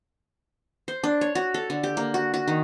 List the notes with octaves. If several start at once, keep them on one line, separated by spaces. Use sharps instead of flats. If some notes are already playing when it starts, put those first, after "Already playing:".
C5
D4
C#5
F#4
A4
D3
G4
A#3
F#4
F#4
D#3